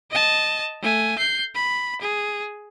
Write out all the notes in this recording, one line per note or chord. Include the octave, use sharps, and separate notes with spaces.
D#5 A5
A3 G#5
G6 C7
B5
G#4